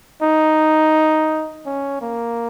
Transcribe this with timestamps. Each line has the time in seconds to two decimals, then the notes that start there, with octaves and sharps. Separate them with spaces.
0.22 D#4
1.66 C#4
2.01 A#3